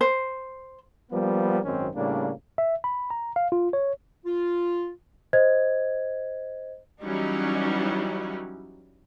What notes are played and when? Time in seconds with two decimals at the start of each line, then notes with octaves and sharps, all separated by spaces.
0.01 C5
1.11 F3 G3 A#3 B3
1.64 G#1 F#2 D#3 C4 C#4
1.95 A2 C#3 G3 A#3 D4
2.58 E5
2.84 B5
3.10 A#5
3.36 F5
3.52 F4
3.73 C#5
4.26 F4
5.33 C5 D#5 G#6
7.02 E3 F#3 G3 C#4 D#4 E4